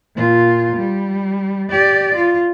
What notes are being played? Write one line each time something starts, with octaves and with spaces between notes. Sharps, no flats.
A#2 F4
G3
G4 D5
F4